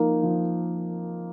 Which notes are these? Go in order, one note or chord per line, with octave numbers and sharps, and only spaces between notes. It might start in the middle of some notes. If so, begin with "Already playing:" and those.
Already playing: F3 A#3 D#4 A#4
F3